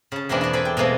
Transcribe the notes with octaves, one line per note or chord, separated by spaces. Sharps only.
C#3 A5
E2 B2 A#3 C4 D4 E4
E4 D5
A4 C5 D5 G#5 B5
G5
B2 G#3 A#3 C4